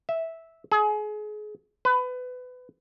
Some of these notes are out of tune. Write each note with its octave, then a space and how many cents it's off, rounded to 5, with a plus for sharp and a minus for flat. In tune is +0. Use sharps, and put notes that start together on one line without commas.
E5 -10
G#4 +30
B4 +25